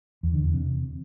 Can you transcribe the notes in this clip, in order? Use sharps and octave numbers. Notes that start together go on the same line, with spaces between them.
E2
D3
E2
C3